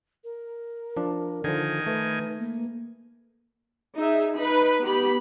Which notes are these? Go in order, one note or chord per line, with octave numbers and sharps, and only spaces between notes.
A#4
F3 D4
D3 D#3 F3 G#5
A3 B4
A#3
D#4 G#4 E5
D#4 B4 B5
B3 G4 B5